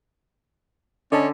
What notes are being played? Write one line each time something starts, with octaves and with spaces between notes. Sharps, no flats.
D3 C#4 D5 D#5 A5